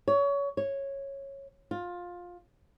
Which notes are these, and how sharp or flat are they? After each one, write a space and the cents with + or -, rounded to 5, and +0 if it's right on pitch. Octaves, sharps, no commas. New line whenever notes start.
C#5 +25
C#5 -10
F4 +15